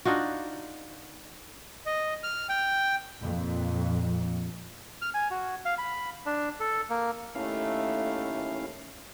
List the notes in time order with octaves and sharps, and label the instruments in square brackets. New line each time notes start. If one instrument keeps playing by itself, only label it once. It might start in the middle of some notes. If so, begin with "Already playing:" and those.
[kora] D4 D#4 F4 F#4
[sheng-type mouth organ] D#5
F6
G5
[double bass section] F2 A#2
[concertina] F6
G#5
F#4
F5
B5
D4
A4
A#3
[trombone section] D#2 A3 [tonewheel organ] C#4 E4 F5